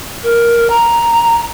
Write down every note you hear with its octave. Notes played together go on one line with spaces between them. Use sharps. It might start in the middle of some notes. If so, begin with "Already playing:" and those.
A#4
A#5